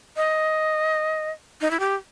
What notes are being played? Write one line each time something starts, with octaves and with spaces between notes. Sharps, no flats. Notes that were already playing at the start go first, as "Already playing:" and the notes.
D#5
D#4
E4
G4